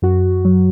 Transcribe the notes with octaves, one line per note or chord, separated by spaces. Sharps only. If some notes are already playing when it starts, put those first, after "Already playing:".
F#2 F#4
F#3